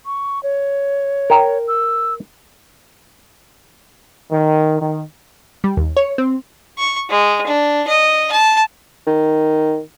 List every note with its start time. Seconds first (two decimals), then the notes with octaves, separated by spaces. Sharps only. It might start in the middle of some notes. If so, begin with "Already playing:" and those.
0.06 C#6
0.43 C#5
1.30 A#4 G5
1.68 E6
4.31 D#3
4.79 D#3
5.64 G3
5.77 D#2
5.97 C#5
6.18 C4
6.79 C#6
7.10 G#3
7.47 D4
7.87 D#5
8.32 A5
9.07 D#3